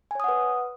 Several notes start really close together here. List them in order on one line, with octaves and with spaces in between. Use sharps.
G#5 C#5 D#6 F#5 B4